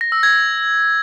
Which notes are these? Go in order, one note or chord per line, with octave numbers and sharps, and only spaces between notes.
A#6
E6
G#6